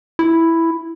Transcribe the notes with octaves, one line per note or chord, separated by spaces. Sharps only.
E4